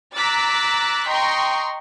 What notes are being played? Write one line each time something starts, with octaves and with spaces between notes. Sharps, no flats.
A#5 D6 E6 F#6 A6 B6
D#5 G5 A#5 C6 C#6